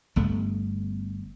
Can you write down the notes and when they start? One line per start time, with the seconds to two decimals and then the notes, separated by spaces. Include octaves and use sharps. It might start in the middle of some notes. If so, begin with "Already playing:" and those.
0.16 G1 G2 A3 B3